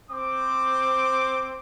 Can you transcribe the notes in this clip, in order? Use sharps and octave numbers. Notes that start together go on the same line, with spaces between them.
C4 C5 D6